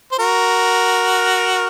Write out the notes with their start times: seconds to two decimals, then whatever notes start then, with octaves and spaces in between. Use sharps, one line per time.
0.12 C5
0.19 F#4 A#4